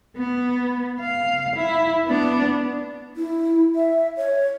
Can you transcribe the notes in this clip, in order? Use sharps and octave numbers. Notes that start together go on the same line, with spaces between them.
B3
F5
E4
B3 D4
E4
E5
C#5